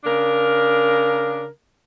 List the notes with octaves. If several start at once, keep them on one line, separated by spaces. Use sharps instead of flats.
C#3 D4 A#4